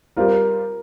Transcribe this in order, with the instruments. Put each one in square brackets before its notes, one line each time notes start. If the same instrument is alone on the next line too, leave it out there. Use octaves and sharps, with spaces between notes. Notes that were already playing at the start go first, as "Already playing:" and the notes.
[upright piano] G3 C4 F4 [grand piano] A#4